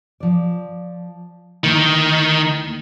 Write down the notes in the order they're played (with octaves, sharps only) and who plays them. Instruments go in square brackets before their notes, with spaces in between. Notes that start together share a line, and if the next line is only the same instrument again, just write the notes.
[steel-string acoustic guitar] F3 D5
[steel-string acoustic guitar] D2 A#3 E4 [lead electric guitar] D#3